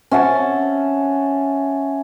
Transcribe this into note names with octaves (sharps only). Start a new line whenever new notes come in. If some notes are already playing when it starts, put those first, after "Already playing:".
C#4 E5 F#5 A5